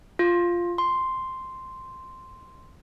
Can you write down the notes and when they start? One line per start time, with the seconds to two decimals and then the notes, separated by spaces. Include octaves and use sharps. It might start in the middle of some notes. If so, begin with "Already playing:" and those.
0.19 F4
0.78 C6